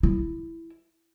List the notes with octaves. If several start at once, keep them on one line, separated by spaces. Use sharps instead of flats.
E4